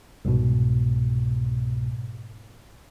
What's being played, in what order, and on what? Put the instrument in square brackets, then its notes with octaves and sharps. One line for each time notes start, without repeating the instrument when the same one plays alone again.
[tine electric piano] C2 G#2 B2